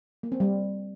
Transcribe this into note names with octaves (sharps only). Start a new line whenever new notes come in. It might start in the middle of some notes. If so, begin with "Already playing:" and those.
A#3
C4
G3